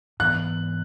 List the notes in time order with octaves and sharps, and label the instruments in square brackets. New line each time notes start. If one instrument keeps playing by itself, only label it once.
[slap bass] G#2 E3 B3 [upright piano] F#6